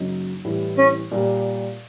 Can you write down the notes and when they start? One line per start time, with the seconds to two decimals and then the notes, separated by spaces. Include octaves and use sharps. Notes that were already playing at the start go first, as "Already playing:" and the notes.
Already playing: F#2 C#3 F#3 A#3 D#4
0.45 A2 E3 G3
0.78 C#4
1.11 A#2 G3 A#3